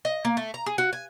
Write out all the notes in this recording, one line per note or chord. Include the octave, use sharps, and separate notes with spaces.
D#5
A#3
A3
A#5
G#4
F#4
G#5